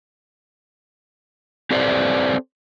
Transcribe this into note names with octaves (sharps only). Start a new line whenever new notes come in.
C4 G4 A4 B4 C5 D5